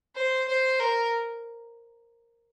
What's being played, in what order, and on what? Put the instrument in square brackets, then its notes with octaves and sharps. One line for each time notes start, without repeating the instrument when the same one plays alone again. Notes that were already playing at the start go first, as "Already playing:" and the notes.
[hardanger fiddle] C5
C5
A#4